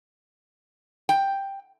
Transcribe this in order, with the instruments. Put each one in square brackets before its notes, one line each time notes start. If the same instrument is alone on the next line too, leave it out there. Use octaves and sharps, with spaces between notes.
[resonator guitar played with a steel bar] G5